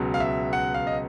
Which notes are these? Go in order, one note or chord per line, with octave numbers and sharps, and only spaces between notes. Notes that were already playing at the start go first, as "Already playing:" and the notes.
Already playing: C#2 B2 F#3
F5
E5
F#5
F5
D#5